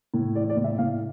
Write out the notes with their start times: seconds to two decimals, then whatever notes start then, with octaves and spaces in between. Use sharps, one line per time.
0.14 A2
0.35 E3 D5
0.50 D5
0.56 A2
0.64 E5
0.78 A2 F5